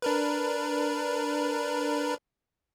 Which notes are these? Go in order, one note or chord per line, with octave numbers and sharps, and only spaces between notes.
D4 A#4 B4